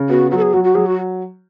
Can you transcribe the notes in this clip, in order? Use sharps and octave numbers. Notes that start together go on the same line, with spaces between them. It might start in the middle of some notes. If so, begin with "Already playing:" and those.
Already playing: C#3
B3 F#4
F#3 F#4
A4
G#4
F#3 F#4
F#4
F#3 G#4
F#4